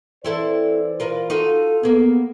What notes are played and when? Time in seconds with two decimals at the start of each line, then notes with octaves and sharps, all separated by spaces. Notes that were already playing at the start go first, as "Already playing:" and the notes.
0.24 E3 C4 E4 A4 C5 D5
1.00 F4 A#4 B4
1.30 D#4 F4 F#4 A4
1.83 A#3 B3 G#4